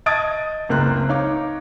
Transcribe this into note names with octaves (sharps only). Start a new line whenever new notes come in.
D#5 A5 D#6 G#6 A6 D7
F#1 C#2 A#3 C4 A#5 F#6
D#4 C#5 F5 D6